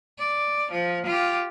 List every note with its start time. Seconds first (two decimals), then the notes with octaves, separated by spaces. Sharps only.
0.19 D5
0.72 F3
1.06 F4 G4